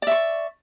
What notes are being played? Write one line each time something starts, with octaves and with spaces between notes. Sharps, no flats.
D5 E5 C#6